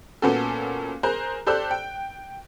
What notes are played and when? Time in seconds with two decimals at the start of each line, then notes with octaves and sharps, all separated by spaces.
0.22 A#2 B3 C#4 F#4 A4
1.03 G#4 A#4 C5 A#5 F#6
1.46 G4 A4 C5 D5 E6 F#6
1.71 G5